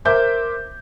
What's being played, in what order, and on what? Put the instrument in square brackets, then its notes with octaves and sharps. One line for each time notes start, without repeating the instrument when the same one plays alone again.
[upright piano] A#4 C5 E5 D6 G6